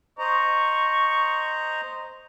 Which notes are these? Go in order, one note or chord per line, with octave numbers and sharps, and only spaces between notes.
C5 D#5 A#5 C#6